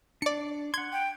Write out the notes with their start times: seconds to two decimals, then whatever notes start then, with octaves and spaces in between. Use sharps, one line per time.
0.22 D4 D5 C#7
0.74 F#5 C6 G#6
0.92 G5